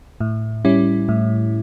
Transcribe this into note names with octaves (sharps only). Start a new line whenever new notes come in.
A2
G3 C#4 E4
A2